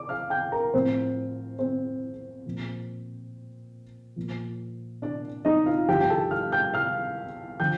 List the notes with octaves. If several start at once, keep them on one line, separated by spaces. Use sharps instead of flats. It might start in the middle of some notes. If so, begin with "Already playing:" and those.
Already playing: D5 D6
F5 F6
G5 G6
A#4 A#5
A2 F3 C4 C5
C4 C5
A#2 F3
A#2 F3
D4 D5
D#4 D#5
F4 F5
G2 D3 F3 G4 G5
G5
A4 A5
F5 F6
G5 G6
F5 F6
D3 F3 G5 G6